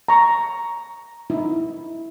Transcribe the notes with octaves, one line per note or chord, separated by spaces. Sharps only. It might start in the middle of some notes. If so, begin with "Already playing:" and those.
A#5 C#6
D#4 E4